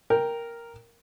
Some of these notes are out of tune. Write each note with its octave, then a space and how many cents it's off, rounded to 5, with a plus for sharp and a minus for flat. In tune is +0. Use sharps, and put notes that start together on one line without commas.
A#4 +0 G5 +5